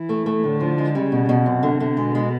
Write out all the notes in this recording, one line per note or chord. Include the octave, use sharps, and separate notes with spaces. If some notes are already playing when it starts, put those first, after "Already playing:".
Already playing: E3
A3
A3
A2 D3
F3
G#3
C#3 G3
B2
B2
F#2 C3
D3
D3
B2 G#3
G#3